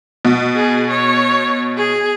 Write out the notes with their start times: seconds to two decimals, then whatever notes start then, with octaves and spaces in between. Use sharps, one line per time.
0.25 B2
0.55 G#4
0.90 C#5
1.77 G#4